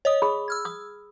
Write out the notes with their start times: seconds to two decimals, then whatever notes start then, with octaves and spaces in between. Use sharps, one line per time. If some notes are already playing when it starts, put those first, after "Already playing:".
0.05 C#5 D#5 D#6
0.22 G#4 B5
0.48 E6 F6 G#6
0.65 D#6